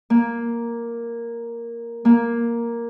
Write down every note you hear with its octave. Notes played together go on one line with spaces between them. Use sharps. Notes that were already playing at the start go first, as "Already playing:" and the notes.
A#3
A#3